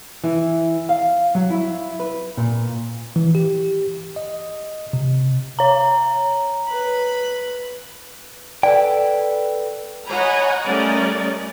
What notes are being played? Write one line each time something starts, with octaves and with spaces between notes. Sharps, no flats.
E3
F5
F#3
E4
B4
A#2
E3
G4
D#5
C3
C#5 A#5
B4 B5
A4 B4 D5 G5
C#5 D#5 F#5 G#5 A#5 B5
G3 A3 C#4 A#4 D5 D#5